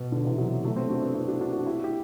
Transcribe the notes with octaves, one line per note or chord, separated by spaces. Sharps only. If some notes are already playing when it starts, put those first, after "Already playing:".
Already playing: B2
B2 D3
C3 E3
D3 F#3
F#3 A3
A3 C4
D4 F#4
B3 D4
C4 E4
D4 F#4
D4 F#4
D4 F#4
E4 G4
G4